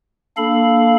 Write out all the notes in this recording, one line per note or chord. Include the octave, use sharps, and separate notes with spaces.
A#3 D4 A4 F5 B5